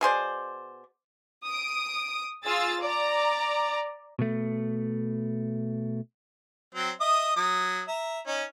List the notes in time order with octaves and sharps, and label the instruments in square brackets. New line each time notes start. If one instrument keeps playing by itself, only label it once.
[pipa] B2 G#4 C5 D5
[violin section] D#6 D7
F4 G#4 E6 A6
D5 A#5
[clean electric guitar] B2 A3
[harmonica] F#3 C4
D#5 E5 D#6
F#3 D#6
E5 A#5
C#4 D#4